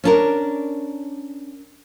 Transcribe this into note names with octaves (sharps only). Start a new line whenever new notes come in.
C#4 D4 A#4